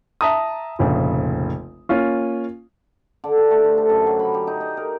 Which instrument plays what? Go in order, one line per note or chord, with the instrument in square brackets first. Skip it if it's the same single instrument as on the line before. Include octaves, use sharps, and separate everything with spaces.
[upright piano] E5 A5 A#5 D#6
F1 A#1 C#3
A#3 C#4 F4
[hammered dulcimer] D3
G4
A3
C5
A4
F#2
F#3
B5
G4
D#4
D#5
A#4